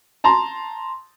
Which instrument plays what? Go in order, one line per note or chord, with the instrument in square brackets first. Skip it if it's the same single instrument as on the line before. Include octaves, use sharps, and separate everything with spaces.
[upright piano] A5 A#5 C6